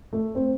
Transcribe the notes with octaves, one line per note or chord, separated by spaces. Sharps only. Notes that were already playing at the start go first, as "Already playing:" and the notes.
A3
C4